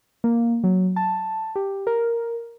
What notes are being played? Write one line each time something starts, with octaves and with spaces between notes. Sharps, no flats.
A#3
F#3
A5
G4
A#4